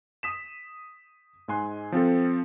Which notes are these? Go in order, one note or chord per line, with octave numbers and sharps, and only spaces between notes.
D#6 B6 E7
G#2 G#3 G#5 C6 F#6
F3 C4 F4 A4